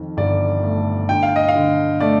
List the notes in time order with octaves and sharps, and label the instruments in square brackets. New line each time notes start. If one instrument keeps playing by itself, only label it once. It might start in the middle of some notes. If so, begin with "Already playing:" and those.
Already playing: [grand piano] F2 D#3
G1 D5
A3
D3 G5
F5
D#5
F5
D3
A3 D5